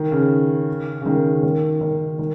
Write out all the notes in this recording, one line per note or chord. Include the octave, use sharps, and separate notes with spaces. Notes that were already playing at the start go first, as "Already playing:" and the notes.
Already playing: D#3
C#3
C#3
D#3
C#3
D#3
D#3
D#3